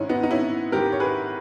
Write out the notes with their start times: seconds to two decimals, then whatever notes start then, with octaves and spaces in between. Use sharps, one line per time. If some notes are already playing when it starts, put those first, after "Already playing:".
Already playing: G#2 D#3 G#3 C#4 E4
0.09 B3 D#4
0.23 D#4
0.31 C#4 E4
0.72 G#2 D#3 G#3 G4 A#4
0.92 C#5
1.00 G#4 B4